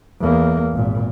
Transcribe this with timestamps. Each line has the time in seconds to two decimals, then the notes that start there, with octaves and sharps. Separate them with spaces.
0.20 E2 A#3
0.72 G#1 A#2